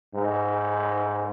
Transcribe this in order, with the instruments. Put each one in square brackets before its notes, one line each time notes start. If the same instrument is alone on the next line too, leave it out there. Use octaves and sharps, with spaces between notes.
[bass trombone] G#2